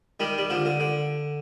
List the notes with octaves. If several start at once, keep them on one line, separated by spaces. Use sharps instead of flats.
D#3 G3
G3
D3 F3
D3
D3